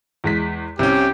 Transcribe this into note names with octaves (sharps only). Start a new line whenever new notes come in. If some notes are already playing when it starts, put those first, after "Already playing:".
E2 G#3 B6
C2 C3 C#4 G4